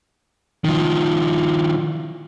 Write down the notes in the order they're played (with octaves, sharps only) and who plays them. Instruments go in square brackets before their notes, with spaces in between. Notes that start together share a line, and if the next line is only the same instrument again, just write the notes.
[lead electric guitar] D#3 F3